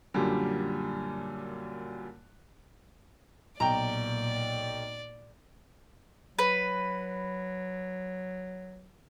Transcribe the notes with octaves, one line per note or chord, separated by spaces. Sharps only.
F#2 A#2 D3 G3
B1 A#2 D5 G5 A#5
F#3 B4